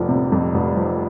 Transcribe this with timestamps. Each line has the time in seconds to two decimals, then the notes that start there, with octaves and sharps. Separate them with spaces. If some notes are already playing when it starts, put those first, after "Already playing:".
Already playing: F1 F2 F3
0.09 C3
0.32 F2
0.54 F1
0.76 F3